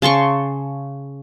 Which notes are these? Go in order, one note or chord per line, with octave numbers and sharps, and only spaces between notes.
C#3 A5 C6 C#6